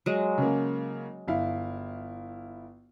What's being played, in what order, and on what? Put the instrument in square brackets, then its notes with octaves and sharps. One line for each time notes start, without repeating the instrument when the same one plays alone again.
[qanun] F#3 G#3
[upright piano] C#3 A#3
G1 E4 F5